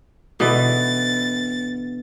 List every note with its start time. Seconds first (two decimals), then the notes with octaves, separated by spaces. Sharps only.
0.40 B2 D3 E3 A6